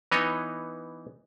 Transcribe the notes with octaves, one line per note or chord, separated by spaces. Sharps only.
E3 B3 D#4 C#5 D#5